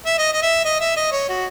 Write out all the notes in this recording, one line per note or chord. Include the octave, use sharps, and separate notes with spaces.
E5
D#5
D#5
E5
D#5
E5
D#5
C#5
F#4